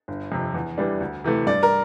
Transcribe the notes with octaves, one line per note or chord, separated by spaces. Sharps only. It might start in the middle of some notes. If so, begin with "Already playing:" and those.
G1
F2 C3
E2
E3 G3 D4
D2
C3 E3 A3
G2 D5
A#4